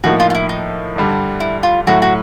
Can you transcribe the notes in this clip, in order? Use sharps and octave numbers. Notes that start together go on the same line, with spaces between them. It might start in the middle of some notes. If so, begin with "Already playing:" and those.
A2 F3 A#3 D#4 F#4
F4
F4
E4
D#4
G2 D3 G3
E4
F4
A2 F#3 A3 F#4
F#4